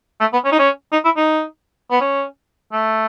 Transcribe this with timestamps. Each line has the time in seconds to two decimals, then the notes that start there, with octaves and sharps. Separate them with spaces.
0.21 A3
0.33 B3
0.45 C#4
0.52 D#4
0.59 C#4
0.93 D#4
1.05 E4
1.17 D#4
1.91 B3
2.01 C#4
2.73 A3